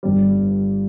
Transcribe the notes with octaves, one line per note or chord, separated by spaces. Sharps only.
G1 G2 G3